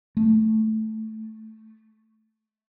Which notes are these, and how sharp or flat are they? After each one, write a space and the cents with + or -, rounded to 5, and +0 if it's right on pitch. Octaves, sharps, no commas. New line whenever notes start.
A3 -5